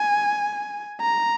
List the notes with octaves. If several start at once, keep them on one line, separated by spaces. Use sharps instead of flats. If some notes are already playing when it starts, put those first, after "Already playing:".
Already playing: G#5
A#5